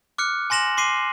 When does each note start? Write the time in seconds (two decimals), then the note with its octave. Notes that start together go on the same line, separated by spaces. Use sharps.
0.18 D6 F6 F#6 C#7
0.50 G#5 C6 A#6 E7 F#7
0.77 C6 D6 C7 D#7